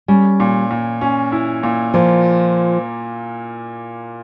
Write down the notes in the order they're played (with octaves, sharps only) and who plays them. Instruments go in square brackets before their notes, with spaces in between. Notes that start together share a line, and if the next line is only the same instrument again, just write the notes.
[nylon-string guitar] G3 [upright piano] C#4
[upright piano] A#2
A#2
C#4
E4
A#2
[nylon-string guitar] F3 [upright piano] A#3